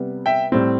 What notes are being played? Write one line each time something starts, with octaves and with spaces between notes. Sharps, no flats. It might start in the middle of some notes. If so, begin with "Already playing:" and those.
Already playing: C3 G3 B3
E5 G5
A2 G3 C4